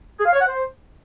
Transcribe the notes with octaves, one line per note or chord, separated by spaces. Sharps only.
G#4
F5
C#5
F#5
C5